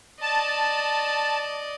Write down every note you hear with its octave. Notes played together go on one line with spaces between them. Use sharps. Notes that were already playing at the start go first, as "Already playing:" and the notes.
D5 D#5 A5